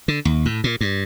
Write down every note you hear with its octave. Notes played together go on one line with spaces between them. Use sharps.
D3
D#2
A2
A#2
G2